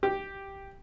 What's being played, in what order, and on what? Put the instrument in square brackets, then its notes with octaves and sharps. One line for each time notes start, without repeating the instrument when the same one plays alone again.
[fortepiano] G4